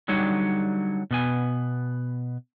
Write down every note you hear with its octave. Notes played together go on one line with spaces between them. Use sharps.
D3 F#3 G3 D#4 C#5
B2 B3 G#5